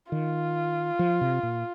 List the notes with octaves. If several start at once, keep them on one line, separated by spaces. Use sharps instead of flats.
D#3 F4
F3
C3
A#2